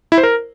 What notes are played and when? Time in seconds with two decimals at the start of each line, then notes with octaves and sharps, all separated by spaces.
0.12 E4
0.18 C5
0.23 A#4